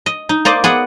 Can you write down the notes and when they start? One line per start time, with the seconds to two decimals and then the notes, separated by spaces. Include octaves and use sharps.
0.06 D#5
0.29 D#4
0.45 A#3 C5 D5 D#5
0.64 B3 G#4 D5 F#5